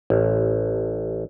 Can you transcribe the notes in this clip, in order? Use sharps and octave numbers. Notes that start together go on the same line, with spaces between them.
A1